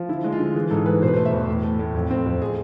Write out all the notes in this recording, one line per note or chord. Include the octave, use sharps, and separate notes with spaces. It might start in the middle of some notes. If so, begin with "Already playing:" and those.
Already playing: F3
D3 E4
G#3
F4
D3
E3 G#4
G#2 A4
E3 B4
B2 C5
B4
A3 C5
E5
E2
A2
A3
A2
F2
C4
F2
G#4